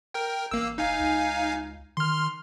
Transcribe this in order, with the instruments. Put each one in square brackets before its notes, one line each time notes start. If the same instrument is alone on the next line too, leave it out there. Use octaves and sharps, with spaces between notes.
[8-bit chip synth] A#4 G5
[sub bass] A1 [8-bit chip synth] A#3 E6
[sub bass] F1 [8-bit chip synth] D#4 F5 G#5
[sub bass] C#2
[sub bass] D#3 [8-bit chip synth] C6 F6